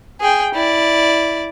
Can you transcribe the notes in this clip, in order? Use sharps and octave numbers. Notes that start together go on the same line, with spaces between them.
G#4 G5
E4 D5